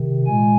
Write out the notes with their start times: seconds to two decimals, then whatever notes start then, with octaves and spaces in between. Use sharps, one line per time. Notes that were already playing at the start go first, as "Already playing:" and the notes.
Already playing: C3 D#3
0.26 A#2 G#3 G#5